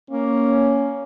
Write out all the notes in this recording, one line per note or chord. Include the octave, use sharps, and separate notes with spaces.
A#3 C#4